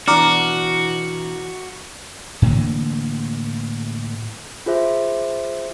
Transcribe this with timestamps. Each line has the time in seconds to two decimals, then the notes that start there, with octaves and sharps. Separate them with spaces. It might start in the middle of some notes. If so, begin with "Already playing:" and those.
0.08 B2 E3 D4 F#4 A#5 D6 F6
2.42 A2 D3 E3 A#3
4.66 F4 G#4 C5 E5